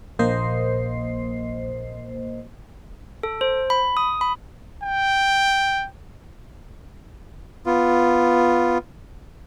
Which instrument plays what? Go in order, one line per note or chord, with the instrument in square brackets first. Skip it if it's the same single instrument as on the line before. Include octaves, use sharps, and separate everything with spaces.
[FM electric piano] A#1 A#3 C5 D#5 C7
[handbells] A4
C5
B5
D#6
B5
[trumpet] G5
[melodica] B3 F4